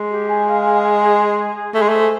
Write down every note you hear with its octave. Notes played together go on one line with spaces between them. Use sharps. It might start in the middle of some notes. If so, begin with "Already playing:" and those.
Already playing: G#3
G4
G#5
F5
G#5
G#5
G#4
G#4
G#4
G#4
A3 G#4
G#3
A3 C5